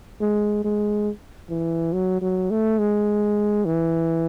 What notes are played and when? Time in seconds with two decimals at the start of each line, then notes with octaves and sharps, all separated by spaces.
0.21 G#3
0.64 G#3
1.50 E3
1.93 F#3
2.22 F#3
2.51 A3
2.79 G#3
3.65 E3